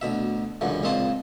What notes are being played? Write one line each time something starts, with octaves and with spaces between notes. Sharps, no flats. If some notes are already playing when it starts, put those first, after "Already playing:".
D2 B2 E5
C#2 F#2 D3 E3
C#2 A#2 C4 D#5 A5 C6